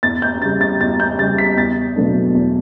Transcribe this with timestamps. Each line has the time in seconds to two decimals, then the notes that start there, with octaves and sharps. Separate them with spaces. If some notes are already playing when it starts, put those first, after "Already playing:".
0.03 E2 A6
0.22 G6
0.42 C#3 G3 A6
0.61 A6
0.81 E2 A6
1.00 G6
1.18 C#3 G3 A6
1.38 B6
1.57 E2 A6
1.96 B2 F#3 A3 D4
2.35 E2